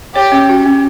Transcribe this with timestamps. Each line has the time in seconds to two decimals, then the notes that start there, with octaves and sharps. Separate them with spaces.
0.15 G4 C#5
0.32 C#4
0.49 F#4
0.66 C#4